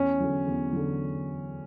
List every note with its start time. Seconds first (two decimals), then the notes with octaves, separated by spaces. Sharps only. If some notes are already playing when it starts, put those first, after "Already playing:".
Already playing: E2 C#4
0.20 D3 F#3
0.46 E2
0.73 D3 F#3